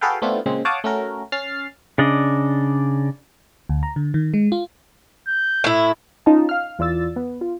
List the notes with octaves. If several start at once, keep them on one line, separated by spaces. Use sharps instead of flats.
F#4 G#4 A4 B4 F5 G5
A3 B3 C4 D4 E4 F4
A#2 C#3 G#3 C4
C#5 F5 F#5 A5 D6 D#6
A3 C#4 F#4 A#4
C#4 F6 A6 C7
C#3 D4 D5 D#5
D2
A#5
D3
D#3
G#3
F4
G6
A2 E4
C#4 D#4 F4 A5
F5 F6
E2 F4 D5 E6 A6
B3
F4